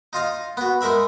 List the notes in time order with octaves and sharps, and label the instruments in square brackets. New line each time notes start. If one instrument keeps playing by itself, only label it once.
[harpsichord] D#4 F4 D#5 F5
B3 F#4
G#3 D#4 A#4 E5 B5